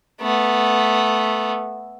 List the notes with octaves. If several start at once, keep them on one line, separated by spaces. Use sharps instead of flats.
A3 B3